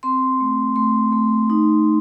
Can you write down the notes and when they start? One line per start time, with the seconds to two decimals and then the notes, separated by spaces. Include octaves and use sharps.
0.03 C4 C6
0.40 A3
0.76 A3 C6
1.12 A3
1.50 D#4